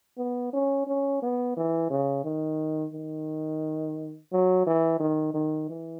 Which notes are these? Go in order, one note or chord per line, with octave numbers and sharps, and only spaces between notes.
B3
C#4
C#4
B3
E3
C#3
D#3
D#3
F#3
E3
D#3
D#3
E3